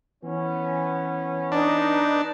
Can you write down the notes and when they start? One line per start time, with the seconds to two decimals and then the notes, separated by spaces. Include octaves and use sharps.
0.24 E3 B3 C#4
1.52 D4 D#4 B4